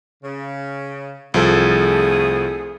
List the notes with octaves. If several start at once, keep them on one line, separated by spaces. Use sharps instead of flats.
C#3
C2 F3 A3 G#4 A4